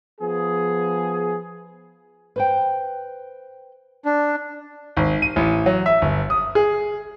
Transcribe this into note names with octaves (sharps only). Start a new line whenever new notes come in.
F3 B3 G#4
B4 C5 G5
D4
G#1
D#7
A1
F#3
E5
G1
D#6
G#4